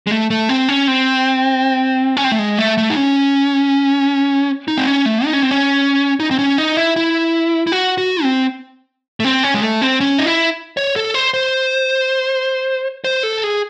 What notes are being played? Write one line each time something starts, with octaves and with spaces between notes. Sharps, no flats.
G#3
A3
A3
C4
C#4
C4
C#4
C4
A3
G#3
A3
A3
D#4
C#4
D#4
C4
C#4
A3
D#4
C#4
C4
C#4
D#4
C4
C#4
D#4
E4
E4
E4
F#4
F#4
C4
A3
C4
C#4
G#3
A3
C4
C#4
D#4
E4
C#5
A4
C5
C5
C5
A4
G#4